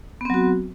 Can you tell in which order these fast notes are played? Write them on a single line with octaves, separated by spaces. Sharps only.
B3 C4 F#3 F#4